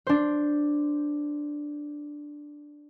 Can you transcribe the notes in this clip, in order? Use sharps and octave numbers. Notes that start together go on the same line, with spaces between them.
D4 C5